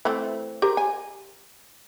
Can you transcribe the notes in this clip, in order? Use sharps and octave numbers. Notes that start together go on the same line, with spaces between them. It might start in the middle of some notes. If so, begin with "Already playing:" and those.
E3 A3 C4
G4 A#4 C5
G#5